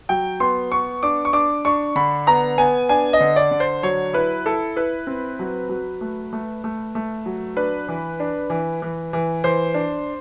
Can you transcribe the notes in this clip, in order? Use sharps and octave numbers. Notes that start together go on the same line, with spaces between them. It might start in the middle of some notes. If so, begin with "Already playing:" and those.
F#3 G5
B3 C6
B3 C#6
D4 D6
C#6
D4 D6
D4 C#6
D3 B5
B3 A#5
B3 G#5
D4 G#5
D#5
D3
D5
D3
C5
F#3 C#5
E4 B4
E4 A4
E4 B4
C4
F#3
F#3
A3
A3
A3
A3
F#3
D4 B4
E3
D4
E3
E3
E3
E3 C5
D4